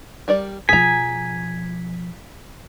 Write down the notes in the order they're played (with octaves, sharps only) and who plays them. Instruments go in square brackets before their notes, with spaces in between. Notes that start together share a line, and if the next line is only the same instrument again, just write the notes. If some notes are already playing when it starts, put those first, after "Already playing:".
[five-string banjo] G3 A#4 D5
[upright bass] B2 F3 [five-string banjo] G#4 A#5 [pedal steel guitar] G#5 [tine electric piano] B6